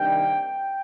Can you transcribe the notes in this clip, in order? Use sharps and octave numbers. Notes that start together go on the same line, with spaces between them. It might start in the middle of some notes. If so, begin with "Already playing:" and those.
Already playing: C3 D#3 G3 A#3 D4 G5
G5